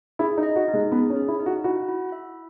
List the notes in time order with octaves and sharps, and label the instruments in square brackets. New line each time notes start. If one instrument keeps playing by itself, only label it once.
[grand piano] E4 [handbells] G#4
[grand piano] D#4
[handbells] D#5
[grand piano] F#4
[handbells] D#4
[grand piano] G#3
[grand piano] B3 [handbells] G#4
[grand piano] C#4
[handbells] G#4
[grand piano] E4
[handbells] D#4
[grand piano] F#4
[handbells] E4 [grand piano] F#4
[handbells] E4
E5